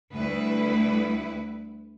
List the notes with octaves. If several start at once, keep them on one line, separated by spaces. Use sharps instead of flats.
D2 G3 A3 E4 B4